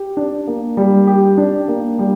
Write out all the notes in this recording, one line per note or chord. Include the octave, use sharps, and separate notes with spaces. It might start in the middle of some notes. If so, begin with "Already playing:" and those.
Already playing: G4
D4
A#3
G3
G4
D4
A#3
G3